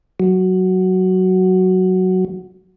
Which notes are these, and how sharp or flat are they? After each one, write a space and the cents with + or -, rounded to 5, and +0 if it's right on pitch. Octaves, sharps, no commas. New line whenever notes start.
F#3 +5